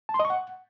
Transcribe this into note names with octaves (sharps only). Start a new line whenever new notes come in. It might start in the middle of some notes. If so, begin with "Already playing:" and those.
A5
C6
D#5
C#6
F#5